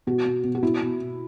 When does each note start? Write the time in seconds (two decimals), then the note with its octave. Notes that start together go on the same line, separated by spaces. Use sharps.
0.07 B2 F#4
0.25 B2
0.44 B2
0.55 F#4
0.63 B2 E4
0.81 B2
1.00 B2